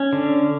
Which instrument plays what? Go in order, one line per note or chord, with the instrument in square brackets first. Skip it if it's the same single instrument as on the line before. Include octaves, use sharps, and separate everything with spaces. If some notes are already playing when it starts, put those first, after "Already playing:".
Already playing: [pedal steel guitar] C#4
D3